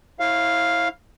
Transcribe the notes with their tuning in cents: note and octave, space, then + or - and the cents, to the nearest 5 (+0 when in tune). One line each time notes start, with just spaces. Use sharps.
E4 -20 C#5 -45 F5 +0